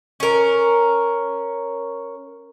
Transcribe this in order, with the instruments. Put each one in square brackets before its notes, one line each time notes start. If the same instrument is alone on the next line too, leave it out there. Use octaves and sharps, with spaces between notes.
[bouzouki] C#4 A#4